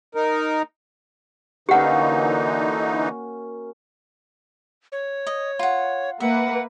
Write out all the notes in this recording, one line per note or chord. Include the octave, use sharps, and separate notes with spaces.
D#4 A#4
D3 E3 A#3 C#4 D#4 F#4 G4 F#5
C#5
D#5
F4 F#5
A#3 B4 E5 F#5